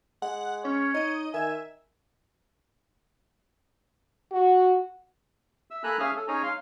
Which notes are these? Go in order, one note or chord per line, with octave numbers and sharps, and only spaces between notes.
G#3 F#5
C#4 C#5
D#4 D#5
D#3 E5 G#5
F#4
E5 E6
A#3 A4 G#5 A#5 B5 F#6
C#4 G#4 E5 F5 D#6 F6
A4
C#4 D#4 G#4 C#5 G#5 A#5
F5 C6